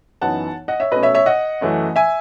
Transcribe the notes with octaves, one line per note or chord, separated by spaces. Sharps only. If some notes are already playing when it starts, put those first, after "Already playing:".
F#2 E3 B3 D#4 F#5 A5
D#5 F#5
C#5 E5
B2 A3 C#4 B4 D#5
C#5 E5
C#5 E5
D#5 F#5
F#2 E3 A3 C#4
E5 G#5